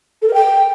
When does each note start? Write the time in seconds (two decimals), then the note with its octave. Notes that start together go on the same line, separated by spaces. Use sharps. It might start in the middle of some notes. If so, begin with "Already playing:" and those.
0.22 A4
0.27 A#4
0.33 G5